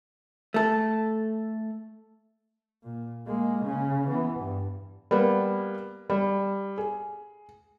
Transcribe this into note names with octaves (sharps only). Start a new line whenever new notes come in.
A3 A4
A#2
G#3 A#3
C#3 C#4
E3 B3
G2
G3 A#3 B3
G3
G#4